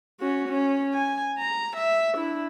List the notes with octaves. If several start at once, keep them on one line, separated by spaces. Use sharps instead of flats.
C#4 F#4
C#4
G#5
A#5
E5
D4 E4